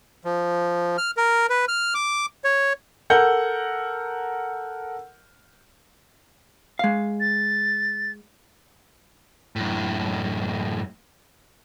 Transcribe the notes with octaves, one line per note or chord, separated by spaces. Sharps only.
F3
F6
A#4
B4
F6
D6
C#5
A4 A#4 F#5 G6
G#3 F5
A6
F#2 A2